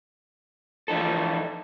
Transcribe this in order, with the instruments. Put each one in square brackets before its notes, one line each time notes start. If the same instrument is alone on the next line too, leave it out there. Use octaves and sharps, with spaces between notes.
[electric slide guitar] E3 F3 D#4 F4 A4